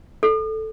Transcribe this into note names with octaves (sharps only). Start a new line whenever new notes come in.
A4